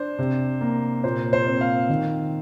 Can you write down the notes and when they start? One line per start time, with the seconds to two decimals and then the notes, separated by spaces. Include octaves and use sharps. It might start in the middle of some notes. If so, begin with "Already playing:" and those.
Already playing: D4 C5
0.19 C3
0.61 A#3
1.04 A#2 C5
1.33 C5
1.47 C4
1.61 F5
1.89 D#3